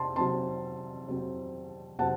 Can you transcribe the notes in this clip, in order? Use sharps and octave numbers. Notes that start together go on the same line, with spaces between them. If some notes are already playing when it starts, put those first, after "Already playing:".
Already playing: C3 C4 A5 C6
C3 F#3 C4 A5 C6
C3 F#3 C4
C3 F#3 C4 F#5 A5